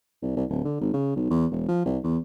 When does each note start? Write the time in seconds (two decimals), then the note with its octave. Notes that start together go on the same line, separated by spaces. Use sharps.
0.22 C2
0.36 C2
0.50 D1
0.65 D3
0.81 G#1
0.93 C#3
1.16 B1
1.30 E2
1.51 E1
1.68 F3
1.86 C2
2.04 E2